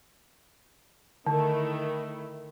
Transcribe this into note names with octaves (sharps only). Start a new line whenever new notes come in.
D3 D#3 A3 E4